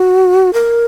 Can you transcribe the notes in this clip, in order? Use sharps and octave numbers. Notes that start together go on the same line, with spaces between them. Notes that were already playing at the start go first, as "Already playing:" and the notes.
Already playing: F#4
A#4